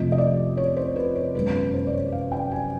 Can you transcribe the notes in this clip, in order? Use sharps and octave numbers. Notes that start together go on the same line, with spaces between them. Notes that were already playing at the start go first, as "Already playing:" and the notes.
Already playing: F2 C3 F3 A3 D#5
D#5
D5
C#5
C5
B4
C#5
F#2 D#3 G#3 B3 B4
B4
C5
D5
C#5
F5
G5
G#5